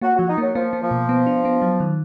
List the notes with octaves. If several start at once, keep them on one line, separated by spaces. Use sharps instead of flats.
A#3 F#4
F3 F#4
D#4
F#3 A#3
F3 A#3
A#3
F3
B2
B3
D4
B3
F#3
D#3